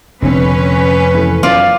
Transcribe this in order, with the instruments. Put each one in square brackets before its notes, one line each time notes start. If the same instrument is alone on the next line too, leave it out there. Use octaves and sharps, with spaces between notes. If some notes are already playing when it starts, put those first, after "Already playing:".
[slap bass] F1 [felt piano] D3 C4 [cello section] C#4 B4
[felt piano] E3 A3
[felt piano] F#2 [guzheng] F4 D5